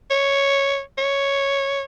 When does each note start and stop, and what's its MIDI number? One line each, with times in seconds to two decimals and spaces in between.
0.10 0.80 73
0.98 1.82 73